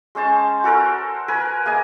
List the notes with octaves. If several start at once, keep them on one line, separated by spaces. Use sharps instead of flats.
G#3 C#4 C5 A5
F#4 A4 A#4 C5
A#4 B4 G#5
A#3 G#4 D#5 G#5